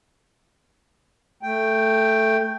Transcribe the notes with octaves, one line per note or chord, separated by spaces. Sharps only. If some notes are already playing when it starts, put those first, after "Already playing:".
A3 G5